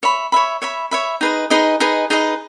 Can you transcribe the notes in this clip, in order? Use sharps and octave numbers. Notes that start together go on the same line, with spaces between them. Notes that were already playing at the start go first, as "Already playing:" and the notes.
C#5 E5 B5
C#5 E5 B5
C#5 E5 B5
C#5 E5 B5
D#4 G#4 B4 D#5
D#4 G#4 B4 D#5
D#4 G#4 B4 D#5
D#4 G#4 B4 D#5